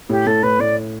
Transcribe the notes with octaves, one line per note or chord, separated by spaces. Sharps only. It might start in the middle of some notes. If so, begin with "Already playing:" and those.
A2 G4
A2 A4
A2 B4
A2 D5